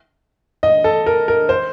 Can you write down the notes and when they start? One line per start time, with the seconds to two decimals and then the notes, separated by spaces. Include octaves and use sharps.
0.63 D#5
0.84 A4
1.06 A#4
1.28 A#4
1.49 C5